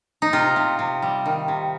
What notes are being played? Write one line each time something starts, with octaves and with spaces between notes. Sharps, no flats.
D#4
C3 F4
C3
C3
G3
D#3
C3